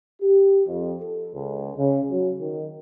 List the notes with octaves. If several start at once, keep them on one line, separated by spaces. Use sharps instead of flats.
G4
F2
A4
C#2
C#3
F#3
D#3